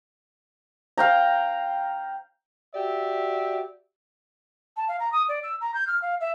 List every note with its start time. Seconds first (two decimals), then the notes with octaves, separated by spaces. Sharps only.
0.97 F5 G5 A#5
2.75 F#4 G4 D5 E5
4.77 A5
4.88 F5
5.00 A#5
5.12 D#6
5.28 D5
5.43 E6
5.61 A#5
5.74 G6
5.87 F6
6.02 F5
6.20 E5